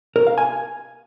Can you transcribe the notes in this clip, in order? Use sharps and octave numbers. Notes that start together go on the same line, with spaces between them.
A#4
F5
G#5